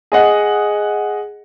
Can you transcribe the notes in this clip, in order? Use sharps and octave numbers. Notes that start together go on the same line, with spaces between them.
G#4 D#5 F#5